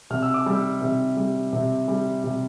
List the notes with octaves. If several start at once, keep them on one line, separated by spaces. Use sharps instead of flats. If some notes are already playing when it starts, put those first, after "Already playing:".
C3 F6
E6
D6
G3 E6
C3
G3
C3
G3
C3